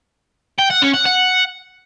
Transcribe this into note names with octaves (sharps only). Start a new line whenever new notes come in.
G5
F#5
C#4
F#5
F#5